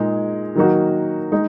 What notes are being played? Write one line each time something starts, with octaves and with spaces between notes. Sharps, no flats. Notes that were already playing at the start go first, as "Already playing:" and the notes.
Already playing: A#2 G#3 D#4
D#3 F#3 A#3 D#4 F#4
G#3 D#4